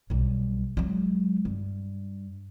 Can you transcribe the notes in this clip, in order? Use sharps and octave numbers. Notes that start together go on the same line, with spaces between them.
B1 G3
F#3 G#3
G2